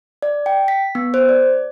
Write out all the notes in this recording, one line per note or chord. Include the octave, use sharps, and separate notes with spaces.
D5
G5
B6
B3
C5
D5